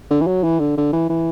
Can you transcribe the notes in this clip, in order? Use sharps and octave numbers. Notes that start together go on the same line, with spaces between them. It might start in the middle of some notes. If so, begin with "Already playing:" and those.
D3
E3
F#3
E3
D3
D3
E3
E3